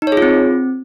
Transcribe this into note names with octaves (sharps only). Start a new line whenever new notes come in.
D#4
C#5
G#4
F4
C4